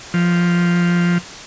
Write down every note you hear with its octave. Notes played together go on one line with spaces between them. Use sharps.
F3